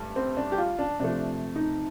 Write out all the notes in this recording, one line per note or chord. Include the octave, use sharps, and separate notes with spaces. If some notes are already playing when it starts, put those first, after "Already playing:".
Already playing: G2 A3
C4
D4
G4
F4
D4
C3 F3 A3 D4
D#4